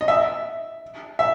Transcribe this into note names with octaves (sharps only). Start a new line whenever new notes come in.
D#5
E5
E5